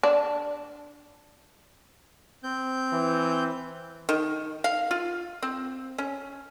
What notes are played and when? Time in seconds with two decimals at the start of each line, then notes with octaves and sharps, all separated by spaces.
0.03 D4
2.44 C4 G6
2.93 E3
4.09 D#3
4.64 F5
4.91 F4
5.42 C4
5.98 C#4